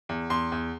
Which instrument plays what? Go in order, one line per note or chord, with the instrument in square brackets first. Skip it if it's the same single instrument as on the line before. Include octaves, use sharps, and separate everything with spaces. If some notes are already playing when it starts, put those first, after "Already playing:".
[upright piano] E2
E2 C6
E2